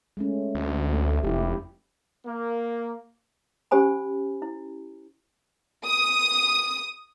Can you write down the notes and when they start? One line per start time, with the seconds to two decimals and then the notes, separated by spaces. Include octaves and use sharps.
0.17 G#3 A3 C#4
0.55 D2
0.93 A3
1.24 F1 E4 G4
2.26 A#3
3.71 C#4 G4 C5 G#5 B5
4.42 E4
5.84 D#6